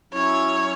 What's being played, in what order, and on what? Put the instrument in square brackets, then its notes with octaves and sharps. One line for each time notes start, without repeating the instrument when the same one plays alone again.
[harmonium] F#3 C#4 E4 [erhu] C#5